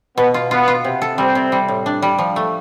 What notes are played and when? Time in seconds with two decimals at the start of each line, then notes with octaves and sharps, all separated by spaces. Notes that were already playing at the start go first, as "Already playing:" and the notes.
0.18 B2 B3
0.34 F4
0.51 B3 F4
0.68 F4
0.84 C3
1.02 A4
1.18 G3 C4
1.35 C3
1.52 G3
1.68 A2
1.86 D4
2.02 G3
2.18 F3
2.36 A3